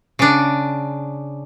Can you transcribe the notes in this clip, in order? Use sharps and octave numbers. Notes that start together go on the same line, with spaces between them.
C#3 D4